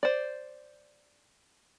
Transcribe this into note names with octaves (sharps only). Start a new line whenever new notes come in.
C5 D5